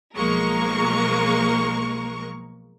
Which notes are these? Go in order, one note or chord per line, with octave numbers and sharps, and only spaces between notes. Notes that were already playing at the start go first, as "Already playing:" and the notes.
B1 F3 G#3 A#3 A#4 C#6